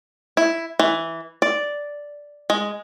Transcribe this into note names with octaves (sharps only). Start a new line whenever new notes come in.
E4
E3
D5
G#3